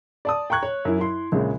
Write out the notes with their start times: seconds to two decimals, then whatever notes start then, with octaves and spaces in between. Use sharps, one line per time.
0.25 D5 A5 D#6
0.50 G5 A#5 C#6 F#6 G#6
0.63 C#5
0.85 F#2 E4
0.99 E4 C6
1.32 A#1 C#3 G#3